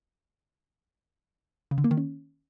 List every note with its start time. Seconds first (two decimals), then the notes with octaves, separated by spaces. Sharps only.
1.71 C#3
1.78 D3
1.84 A#3
1.91 D#3
1.97 C#4